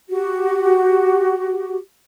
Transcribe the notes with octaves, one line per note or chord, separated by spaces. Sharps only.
F#4 G4